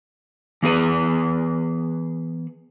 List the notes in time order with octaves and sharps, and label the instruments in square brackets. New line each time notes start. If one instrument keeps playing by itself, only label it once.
[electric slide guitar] E3 B3 G#4 B4